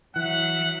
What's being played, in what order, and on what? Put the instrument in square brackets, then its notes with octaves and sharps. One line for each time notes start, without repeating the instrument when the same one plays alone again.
[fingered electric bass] E3 [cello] F#3 E5 [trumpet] F#5